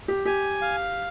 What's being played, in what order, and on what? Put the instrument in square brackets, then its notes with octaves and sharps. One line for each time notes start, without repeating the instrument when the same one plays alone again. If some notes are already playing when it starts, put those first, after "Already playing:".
[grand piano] G4
[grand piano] G4 [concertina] G#5
[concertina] F5